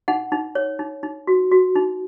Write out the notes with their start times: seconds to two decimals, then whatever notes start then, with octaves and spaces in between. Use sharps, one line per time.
0.08 D#4 F#5
0.32 D#4
0.55 C#5
0.79 D#4
1.03 D#4
1.27 F#4
1.52 F#4
1.75 D#4